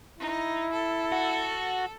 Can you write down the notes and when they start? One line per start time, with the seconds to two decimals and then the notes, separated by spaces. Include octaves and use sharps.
0.18 D#4 E4
0.70 A4
1.12 F#4